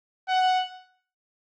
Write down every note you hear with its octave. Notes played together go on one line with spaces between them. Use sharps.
F#5